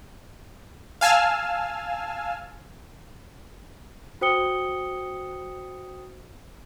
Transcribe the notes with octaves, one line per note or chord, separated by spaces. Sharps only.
F5 G#5 A5 E6 F6
F#4 C5 G5 D#6 C#7 G7